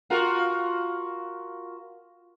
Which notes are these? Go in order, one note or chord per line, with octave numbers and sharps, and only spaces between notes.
F4 F#4 A#4